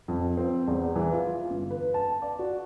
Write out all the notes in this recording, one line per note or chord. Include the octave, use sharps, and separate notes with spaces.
F2
C4
E2
E3
F4
G1
B4
A5
D5
F#4